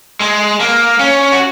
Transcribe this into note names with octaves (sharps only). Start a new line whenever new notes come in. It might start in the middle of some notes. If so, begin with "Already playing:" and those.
G#3
A#3
C#4
F#4